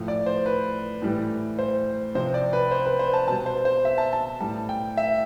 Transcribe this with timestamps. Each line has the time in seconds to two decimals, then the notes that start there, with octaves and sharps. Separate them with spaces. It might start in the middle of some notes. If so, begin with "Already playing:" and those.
Already playing: A2 F3
0.08 D5
0.26 C5
0.46 B4
1.02 A2 E3 G3
1.59 C5
2.15 C3 F3 C5
2.34 D5
2.53 B4
2.71 C5
2.86 B4
2.99 C5
3.14 A5
3.27 B2 A5
3.32 G3
3.46 C5
3.65 C5
3.85 E5
3.98 A5
4.13 A5
4.41 A2 G3 A5
4.69 G5
4.97 E5